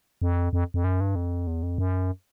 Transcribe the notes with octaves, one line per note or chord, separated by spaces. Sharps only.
F2
F2
F2
F#2
G2
F2
E2
F2
F#2